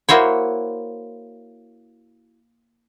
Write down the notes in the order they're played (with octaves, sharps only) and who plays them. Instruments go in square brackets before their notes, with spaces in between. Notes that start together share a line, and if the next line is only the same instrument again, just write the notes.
[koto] A#3 E4 F#4 C5 C#5